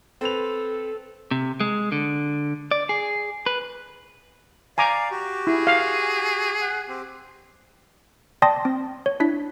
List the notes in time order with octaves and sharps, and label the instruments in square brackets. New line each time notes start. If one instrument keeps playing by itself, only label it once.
[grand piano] C4 B4 F7 [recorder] A4
[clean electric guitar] C3
G#3
D3
D5
G#4
B4
[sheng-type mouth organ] D5 F5 [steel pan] G#5 A#5 D6
[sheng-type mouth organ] F#4 G4
[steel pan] E4 [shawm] G#4
[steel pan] F5
[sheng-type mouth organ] F#5
C4 G4
[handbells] D5 G5 A5 C6 D#6 A#6
C4
C#5
D4 E4 B6